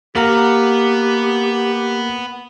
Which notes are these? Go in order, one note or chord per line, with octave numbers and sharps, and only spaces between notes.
A#3 B3 G4 A#4 F#5 A#5